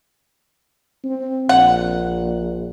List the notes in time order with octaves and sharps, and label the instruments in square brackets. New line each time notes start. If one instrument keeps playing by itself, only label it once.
[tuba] C4
[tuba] A#1 [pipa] F#5